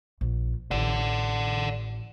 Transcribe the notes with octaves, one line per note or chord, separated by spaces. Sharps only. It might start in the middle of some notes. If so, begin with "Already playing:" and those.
A#1
A1 D5 F#5